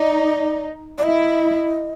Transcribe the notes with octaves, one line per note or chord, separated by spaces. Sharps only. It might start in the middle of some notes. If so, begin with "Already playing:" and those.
Already playing: D#4 D5
D5
E4 D#5